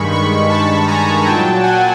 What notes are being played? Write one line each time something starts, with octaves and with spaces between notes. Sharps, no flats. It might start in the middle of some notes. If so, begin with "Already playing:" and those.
Already playing: G2 D#3 G#3 B5 C#6
B5 C#6
A5 B5
G#5 A#5
A#2 F#3 G5 A5
F#5 G#5